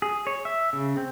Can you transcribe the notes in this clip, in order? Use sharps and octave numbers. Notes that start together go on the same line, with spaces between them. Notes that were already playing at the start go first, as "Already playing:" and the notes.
G#4
C#5
E5
C#3
C4